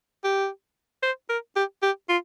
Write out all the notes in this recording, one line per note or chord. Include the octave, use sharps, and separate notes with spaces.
G4
C5
A#4
G4
G4
F4